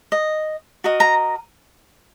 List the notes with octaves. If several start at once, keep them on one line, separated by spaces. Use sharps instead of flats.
D#5
F#4 A#4 D#5
A#5